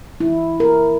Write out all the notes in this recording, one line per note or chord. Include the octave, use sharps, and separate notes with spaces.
E4
A#4